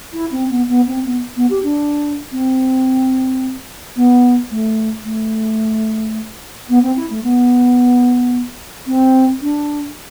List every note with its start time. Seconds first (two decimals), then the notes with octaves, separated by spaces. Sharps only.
0.13 E4
0.31 C4
0.49 B3
0.68 B3
0.86 C4
1.04 B3
1.36 B3
1.49 G4
1.63 D4
2.31 C4
3.96 B3
4.51 A3
5.04 A3
6.69 B3
6.82 C4
6.96 E4
7.10 A3
7.23 B3
8.86 C4
9.41 D4